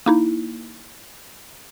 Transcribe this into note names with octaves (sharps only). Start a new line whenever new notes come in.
A#3 D#4 E4